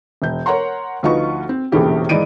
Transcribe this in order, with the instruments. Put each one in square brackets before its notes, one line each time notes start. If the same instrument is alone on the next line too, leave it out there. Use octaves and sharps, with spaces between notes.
[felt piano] E1 G6
A#4 C#5 F#5 A#5 C6
D2 F3 D#4 F4 B4 C#6
C4
E1 A#1 C#3 E3 G4 A4
G#2 E3 D#4 D5 D7 D#7